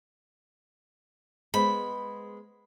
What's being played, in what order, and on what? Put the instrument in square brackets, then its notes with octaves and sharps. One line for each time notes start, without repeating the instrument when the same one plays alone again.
[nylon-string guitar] G#3 B3 C5 [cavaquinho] B5